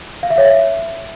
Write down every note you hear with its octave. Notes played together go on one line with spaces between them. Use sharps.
F5
E5
C#5
E5